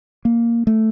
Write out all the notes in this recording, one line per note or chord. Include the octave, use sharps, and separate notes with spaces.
A#3
A3